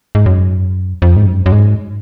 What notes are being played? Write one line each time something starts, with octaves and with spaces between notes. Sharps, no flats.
G#2
F#2
F2
G#2
F#2
F#2
G#2